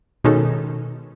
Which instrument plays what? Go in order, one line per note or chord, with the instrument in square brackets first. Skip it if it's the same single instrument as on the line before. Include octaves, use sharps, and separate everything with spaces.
[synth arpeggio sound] B2 D#3 G#3 C#4 D#4 A4